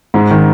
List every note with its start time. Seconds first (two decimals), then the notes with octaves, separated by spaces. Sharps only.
0.14 G#2
0.31 D#3